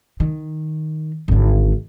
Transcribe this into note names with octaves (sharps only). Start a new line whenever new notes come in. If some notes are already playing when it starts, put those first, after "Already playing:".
D#3
G#1 D3